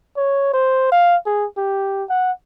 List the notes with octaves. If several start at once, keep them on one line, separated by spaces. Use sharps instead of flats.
C#5
C5
F5
G#4
G4
F#5